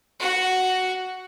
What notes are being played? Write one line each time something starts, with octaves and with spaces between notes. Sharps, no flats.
F#4 F#5